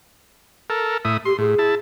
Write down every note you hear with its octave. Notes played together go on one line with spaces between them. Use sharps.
A4 A#4
A2 E4 D#6
G4 C6
A2 G#4
E4 A5